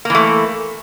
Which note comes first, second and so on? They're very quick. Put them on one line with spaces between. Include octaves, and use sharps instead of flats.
A#3 E3 A3